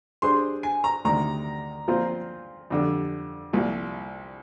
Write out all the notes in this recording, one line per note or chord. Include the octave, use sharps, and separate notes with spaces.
G3 D4 G#4 C5 C6
G#5
A#5
D2 C3 D#3 G3 A#5
A#2 F3 C4 F4 C5
F2 D3 G3
C2 A#2 F3